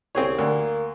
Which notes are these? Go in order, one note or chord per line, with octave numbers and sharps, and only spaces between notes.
C2 C4 G#4 C#5
D2 A#3